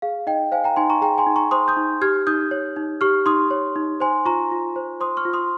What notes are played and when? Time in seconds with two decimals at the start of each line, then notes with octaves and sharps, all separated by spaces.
0.02 G#4 F5
0.27 D#4 D#5 G5
0.52 C5 F5 G#5
0.64 G5 A#5
0.76 D#4 G#5 C6
0.90 A#5 C#6
1.01 G#4 G5 A#5
1.18 G#5 C6
1.26 D#4
1.36 A#5 C#6
1.51 C5 C6 D#6
1.68 D#6 G6
1.77 D#4
2.01 G4 F6 G#6
2.27 D#4 D#6 G6
2.51 C#5
2.76 D#4
3.01 G4 C#6 F6
3.26 D#4 C6 D#6
3.51 C#5
3.76 D#4
4.00 C5 G#5 C6
4.25 F4 A#5 C#6
4.51 F4
4.76 C5
5.00 C5 C6 D#6
5.17 C#6 F6
5.25 F4
5.33 C6 D#6